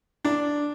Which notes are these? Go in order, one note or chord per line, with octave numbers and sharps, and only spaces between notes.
D4